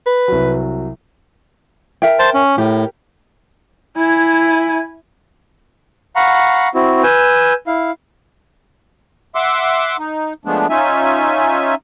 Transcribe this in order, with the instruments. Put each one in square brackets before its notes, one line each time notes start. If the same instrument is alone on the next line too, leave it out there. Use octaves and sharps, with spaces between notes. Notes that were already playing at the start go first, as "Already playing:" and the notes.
[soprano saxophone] B4
[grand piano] C2 F#3
[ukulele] A#4 E5 G5
[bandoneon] C5 A5
C#4
[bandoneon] A2 [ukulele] G4 A#4
[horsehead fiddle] E4 G#5
[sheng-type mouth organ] F5 F#5 A#5 B5 C#6
C4 E4 F#4
B4 G#5 E6 G6
E4 F5
[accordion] E5 F#5 C6 D6 E6
D#4
F3 G#3 A3 B3 D4
C#4 D#4 F4 E5 G#5